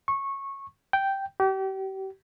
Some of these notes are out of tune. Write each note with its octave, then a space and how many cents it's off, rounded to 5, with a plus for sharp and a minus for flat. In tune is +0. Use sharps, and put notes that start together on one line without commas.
C#6 -15
G5 -5
G4 -35